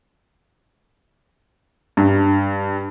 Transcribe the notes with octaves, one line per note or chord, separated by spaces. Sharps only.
G2